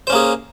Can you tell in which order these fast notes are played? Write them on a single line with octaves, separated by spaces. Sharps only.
C5 C#4 A#3 G#4